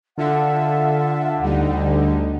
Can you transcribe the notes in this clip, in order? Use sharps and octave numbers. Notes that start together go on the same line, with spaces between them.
D3 F4 A4 E5 F#5
D2 G3 D#4